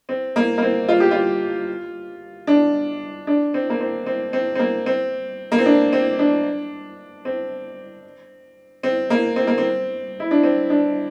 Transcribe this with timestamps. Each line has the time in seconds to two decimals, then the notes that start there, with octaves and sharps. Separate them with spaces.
0.09 C4
0.36 A#3
0.58 A#3
0.62 C4
0.88 F4
1.00 G4
1.11 F4
2.47 D4
3.27 D4
3.54 C4
3.70 A#3
3.81 C4
4.06 C4
4.33 C4
4.55 C4
4.59 A#3
4.86 C4
5.52 A#3
5.59 C4
5.66 D4
5.93 C4
6.19 D4
7.25 C4
8.83 C4
9.10 A#3
9.36 C4
9.47 A#3
9.58 C4
10.20 E4
10.31 D4
10.43 C4
10.70 D4